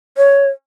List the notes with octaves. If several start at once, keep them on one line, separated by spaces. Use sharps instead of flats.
C#5